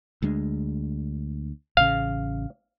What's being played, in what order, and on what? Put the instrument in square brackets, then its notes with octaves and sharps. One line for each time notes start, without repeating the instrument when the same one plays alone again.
[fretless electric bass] D2 G#3 D4
[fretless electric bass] A1 C#3 [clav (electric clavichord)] F5